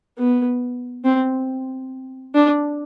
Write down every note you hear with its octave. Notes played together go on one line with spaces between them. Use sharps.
B3
C4
D4